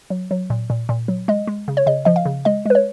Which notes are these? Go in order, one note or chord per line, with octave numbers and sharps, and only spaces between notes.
F#3
F#3
A#2
A#2
A#2
F#3
G#3 D#5
G#3
C#3
C#5
C#3 D#5
F3 D#5
F5
C#3
G#3 D#5
G#3 B4
C#5